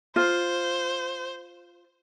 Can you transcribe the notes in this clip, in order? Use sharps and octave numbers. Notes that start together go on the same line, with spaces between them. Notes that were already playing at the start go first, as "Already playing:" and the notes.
F4 C5